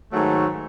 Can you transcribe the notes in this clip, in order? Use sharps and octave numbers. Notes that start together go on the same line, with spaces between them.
G#2 D#3 F#3 A3